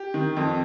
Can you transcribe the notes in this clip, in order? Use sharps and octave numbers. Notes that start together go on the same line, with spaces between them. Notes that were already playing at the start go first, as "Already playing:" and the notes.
Already playing: G4
D#3
F2